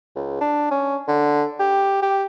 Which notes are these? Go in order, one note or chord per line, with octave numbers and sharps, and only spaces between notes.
C#2
D4
C#4
D3
G4
G4